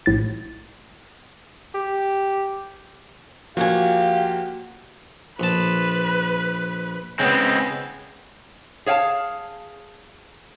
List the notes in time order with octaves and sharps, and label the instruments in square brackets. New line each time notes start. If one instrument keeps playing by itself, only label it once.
[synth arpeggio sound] A#1 A2 A6
[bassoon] G4
[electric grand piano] F3 A#3 [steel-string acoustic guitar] F#4 G#5 [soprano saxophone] G4 [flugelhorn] F5
[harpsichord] A#1 A5 [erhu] B4
[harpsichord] C#3 B3 [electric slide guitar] G#3 C4
[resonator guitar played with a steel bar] G#4 C#5 F5 G5 A5